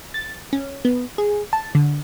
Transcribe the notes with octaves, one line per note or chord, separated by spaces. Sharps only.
A6
C#4
B3
G#4
A5
D3